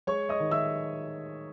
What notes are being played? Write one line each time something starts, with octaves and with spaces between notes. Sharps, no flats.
G#3 C#5 C#6
D#5 D#6
D#3
E5 E6